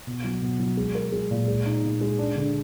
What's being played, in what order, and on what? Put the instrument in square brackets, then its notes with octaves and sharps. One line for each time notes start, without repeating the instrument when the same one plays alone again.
[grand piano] B2
F#3
B2
F#3
G#3
A#4
G#3
A#2
G#3
D#4
A#2
G#3
D4
D3